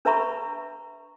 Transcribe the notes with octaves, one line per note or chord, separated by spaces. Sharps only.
D4 B4 E5 A#5 B5 C#6